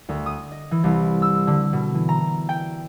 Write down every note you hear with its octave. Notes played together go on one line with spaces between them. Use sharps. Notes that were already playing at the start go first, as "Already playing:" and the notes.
D2
D#6
D#5
E3
C2
E6
D3
B2
E3
A#5
G5